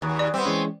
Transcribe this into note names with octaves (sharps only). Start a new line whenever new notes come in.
D#2 F#4 G#4 B4
D5 B5
G3 B3 C4 C5 E5 D6
E3 G#3 C#4 G#5 C6 C#6